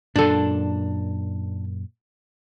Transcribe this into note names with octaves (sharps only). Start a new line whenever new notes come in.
F#2 A#2 D4 A4